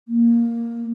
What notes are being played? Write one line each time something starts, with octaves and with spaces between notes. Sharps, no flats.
A#3